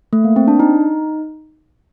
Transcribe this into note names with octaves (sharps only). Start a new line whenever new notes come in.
A3
A#3
C4
D4
D#4